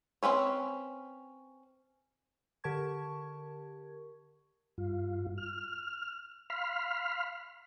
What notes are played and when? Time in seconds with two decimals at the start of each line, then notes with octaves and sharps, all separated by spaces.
0.23 C4 C#4 B4 C#5
2.64 D3 G4 A#4 A5 C#6 G#6
4.78 G2 F4
5.38 F6
6.50 F5 B5 C6 F6